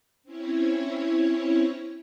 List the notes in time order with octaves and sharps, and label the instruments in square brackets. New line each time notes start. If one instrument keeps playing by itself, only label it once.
[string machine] C4 C#4 E4 C#5